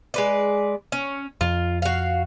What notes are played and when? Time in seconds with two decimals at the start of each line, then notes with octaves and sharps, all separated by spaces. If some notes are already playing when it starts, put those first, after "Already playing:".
0.14 G#3 B4 D5
0.92 C#4
1.41 F2 F4
1.82 F#4 F5